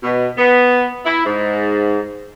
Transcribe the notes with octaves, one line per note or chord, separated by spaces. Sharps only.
B2
B3
E4
G#2